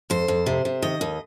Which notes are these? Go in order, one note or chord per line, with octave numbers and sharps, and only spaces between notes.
F2 C5
F2
C3
C3
D#3 D#5
D#2